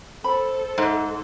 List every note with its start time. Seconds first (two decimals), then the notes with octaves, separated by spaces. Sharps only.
0.24 A4 C5 B5
0.78 G#2